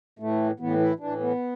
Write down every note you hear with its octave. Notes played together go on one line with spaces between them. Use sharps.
A2 E3 A3
A2 E3 B3
E4
A2 E3 D4
B3